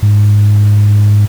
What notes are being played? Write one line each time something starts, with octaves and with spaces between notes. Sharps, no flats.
G#2